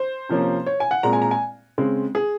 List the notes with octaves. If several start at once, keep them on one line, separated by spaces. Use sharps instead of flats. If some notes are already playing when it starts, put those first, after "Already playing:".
Already playing: C5
C3 F3 A#3 C#4
C#5
G#5
F#5
A#2 G#3 C4 A#5
G#5
A#5
G#5
C#3 G#3 C4
G#4